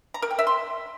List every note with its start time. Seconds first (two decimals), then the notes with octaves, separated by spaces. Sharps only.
0.14 A#5
0.22 A#4
0.31 G5
0.39 E5
0.47 C6